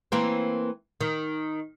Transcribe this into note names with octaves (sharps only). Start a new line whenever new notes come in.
E3 A#3 C4
D#3